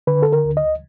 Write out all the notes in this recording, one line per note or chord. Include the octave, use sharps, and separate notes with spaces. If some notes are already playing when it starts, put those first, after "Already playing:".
D3 B4
A4
A#4
D2
D#5